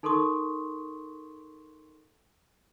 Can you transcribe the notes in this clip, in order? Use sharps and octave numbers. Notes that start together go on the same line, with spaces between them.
D#4 A4 A#4 C6 C#6 D#6